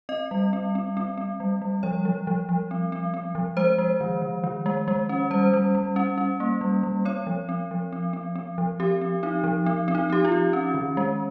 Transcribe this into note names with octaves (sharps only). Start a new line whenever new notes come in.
C4 D#5
G3
C4
C4
C4
C4
G3
G3
F3 C#5
F3
F3
F3
C4
C4
C4
F3
G#3 C5
G#3
D#3
D#3
D#3
G#3
G#3
C#4
G3 C5
G3
G3
C#4
C#4
A#3
G3
G3
C4 C#5
F3
C4
F3
C4
C4
C4
F3
C4 G4
C4
C4 D#4
F3
C4
C4
D#4
C4 G4
F4
C4
C#4
D#3
G#3